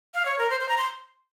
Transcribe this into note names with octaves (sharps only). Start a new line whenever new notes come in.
F5
C#5
A#4
C5
C5
A#5
C6